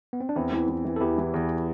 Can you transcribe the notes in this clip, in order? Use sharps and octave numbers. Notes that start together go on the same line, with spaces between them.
B3
C4
D4
E2 C4 E4
E3
E3
E3
A4
E2 E4 G4
E3
E2